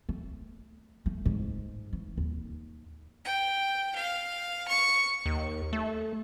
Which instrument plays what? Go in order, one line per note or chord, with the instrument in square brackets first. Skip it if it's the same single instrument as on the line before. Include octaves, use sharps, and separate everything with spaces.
[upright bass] A3
A3
G#2
E3
D#2
[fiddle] G5
F5
C#6
[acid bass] D#2
A3